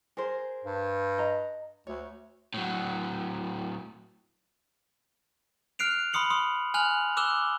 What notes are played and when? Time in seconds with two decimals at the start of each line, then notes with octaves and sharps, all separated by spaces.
0.17 G#4 A#4 C5
0.64 G2
1.18 D#5 A#5
1.87 D2 C#5
2.54 A2 F#3
5.79 F6 F#6 C7 D7 F7
6.13 B5 C6 D#6 C#7 F#7
6.30 C6 D#6
6.74 G#5 F6 F#6 F7 F#7
7.17 D6 E6 F#6 E7 G7